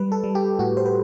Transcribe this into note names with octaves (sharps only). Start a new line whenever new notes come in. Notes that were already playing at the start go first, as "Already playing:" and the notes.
Already playing: G3 B4
A4
G3
G4
A2 F#4
C5
B4